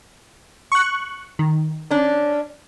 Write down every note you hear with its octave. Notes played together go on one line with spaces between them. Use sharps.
C#6 F#6
D#3
C#4 D4